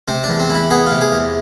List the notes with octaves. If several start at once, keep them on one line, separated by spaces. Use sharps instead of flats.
C3 C4
D4
E2
C4
E3 E4
B3 G#4
C3 F4
G#4
E2